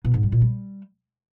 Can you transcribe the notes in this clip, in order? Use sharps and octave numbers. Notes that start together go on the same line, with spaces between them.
B2
G#2
G3
A#2
G3